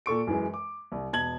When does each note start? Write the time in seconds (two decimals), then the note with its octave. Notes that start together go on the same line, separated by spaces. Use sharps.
0.06 A#2 A4 C#6 D7
0.27 F#2 E3 G#3
0.54 D6
0.92 C2
1.13 E1 A5 G#6 F#7